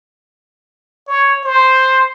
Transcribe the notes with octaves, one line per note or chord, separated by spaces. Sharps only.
C#5
C5